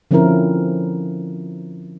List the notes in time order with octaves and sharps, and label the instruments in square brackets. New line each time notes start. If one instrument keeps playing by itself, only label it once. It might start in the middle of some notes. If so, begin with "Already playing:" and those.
[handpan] D3 F3 C4 C#4 E4 A#4